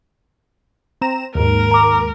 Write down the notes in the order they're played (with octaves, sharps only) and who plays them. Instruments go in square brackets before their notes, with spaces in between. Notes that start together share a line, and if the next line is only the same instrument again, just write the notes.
[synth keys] C4 A#5 E7
[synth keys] D#2 G#2 [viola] A#4
[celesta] A#5 D6